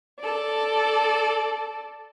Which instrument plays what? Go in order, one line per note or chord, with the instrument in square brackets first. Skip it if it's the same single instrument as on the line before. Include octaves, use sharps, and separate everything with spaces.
[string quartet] A4 D5